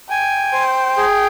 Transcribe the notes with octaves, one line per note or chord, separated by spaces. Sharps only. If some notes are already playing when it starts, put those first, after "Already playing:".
G5 G#5
C5
G#4